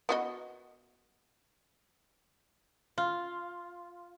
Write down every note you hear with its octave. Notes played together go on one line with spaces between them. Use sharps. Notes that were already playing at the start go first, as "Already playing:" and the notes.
B3 F#4 D#5
F4